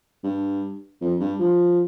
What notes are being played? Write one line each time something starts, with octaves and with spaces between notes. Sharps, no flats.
G2
F2
G2
F3